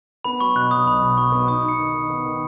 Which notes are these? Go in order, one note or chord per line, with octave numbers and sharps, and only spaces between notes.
B3 B5
F#3 C#6
B2 F#6
F#3 D#6
B1 B5
B2
F#3 C#6
B3
D#4 D#6
D#4
C#7
D#3
D#3
B3
D#3